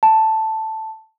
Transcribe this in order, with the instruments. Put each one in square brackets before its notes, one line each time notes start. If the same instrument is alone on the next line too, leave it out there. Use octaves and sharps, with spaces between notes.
[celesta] A5